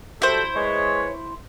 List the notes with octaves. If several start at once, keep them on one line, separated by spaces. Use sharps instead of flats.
G3 E4 F#4 A4 C5
G#3 B4 C#5